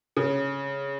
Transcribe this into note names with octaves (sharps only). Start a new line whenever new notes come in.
C#3